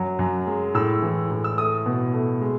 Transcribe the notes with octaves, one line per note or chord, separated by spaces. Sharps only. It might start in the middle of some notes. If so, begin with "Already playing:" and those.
Already playing: F#2 F#3
F#2
G#3
A2 E6
E3
A2
E6
A3 D#6
B2
A3
G#3